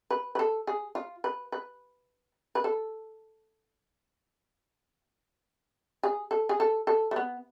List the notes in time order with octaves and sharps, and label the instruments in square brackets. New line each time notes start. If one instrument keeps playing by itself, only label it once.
[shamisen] B4
B4
A4
G#4
F4
B4
B4
B4
A4
G#4
A4
G#4
A4
A4
A3
B3